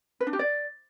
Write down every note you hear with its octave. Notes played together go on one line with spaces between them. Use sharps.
B4
D4
G4
D5